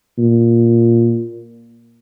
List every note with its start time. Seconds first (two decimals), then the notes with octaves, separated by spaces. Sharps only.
0.18 A#2